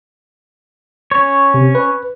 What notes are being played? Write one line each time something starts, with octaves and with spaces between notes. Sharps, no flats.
C#4 C#5
C3
B4